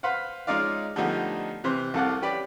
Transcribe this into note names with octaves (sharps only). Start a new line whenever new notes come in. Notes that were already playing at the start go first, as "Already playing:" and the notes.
B4 C5 F5 F#5
G#3 C#4 D#4 F4 D5 F5
D3 F3 G3 A3 B3 D#4
C3 E3 C5
C2 C3 A4 F5 F#5 D6
C#4 G4 B4 D5